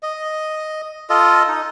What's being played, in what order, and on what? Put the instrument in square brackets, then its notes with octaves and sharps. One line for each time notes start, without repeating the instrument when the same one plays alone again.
[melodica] D#5
F4 A4 D#5
D#4